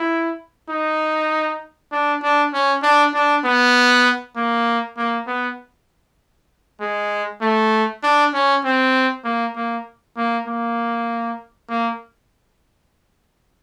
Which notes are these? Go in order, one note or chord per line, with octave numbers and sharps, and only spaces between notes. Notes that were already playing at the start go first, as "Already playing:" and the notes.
Already playing: E4
D#4
D4
D4
C#4
D4
D4
B3
A#3
A#3
B3
G#3
A3
D4
C#4
C4
A#3
A#3
A#3
A#3
A#3